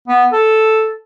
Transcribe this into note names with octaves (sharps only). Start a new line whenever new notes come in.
B3
A4